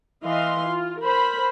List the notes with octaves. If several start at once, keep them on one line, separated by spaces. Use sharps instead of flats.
E3 D#5 F5 C6
F4
A#4 C5 B5